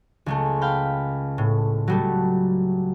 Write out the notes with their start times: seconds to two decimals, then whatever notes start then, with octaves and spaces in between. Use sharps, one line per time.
0.26 C#2 G#3 A3
0.61 F5 G5 B5
1.38 A2
1.88 F#3 G3 A3